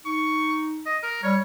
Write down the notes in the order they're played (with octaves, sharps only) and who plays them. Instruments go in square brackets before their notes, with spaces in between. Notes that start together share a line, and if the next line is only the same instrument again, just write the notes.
[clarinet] D#4 [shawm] C#6
[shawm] D#5
A#4
[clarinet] G3 [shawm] C#5